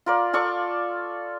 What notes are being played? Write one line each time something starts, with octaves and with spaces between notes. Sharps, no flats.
F4 A#4 D5
F4 A4 D5 C#6